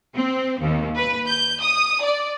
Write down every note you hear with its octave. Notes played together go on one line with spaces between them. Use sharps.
C4
D#2
B4
G6
D#6
D5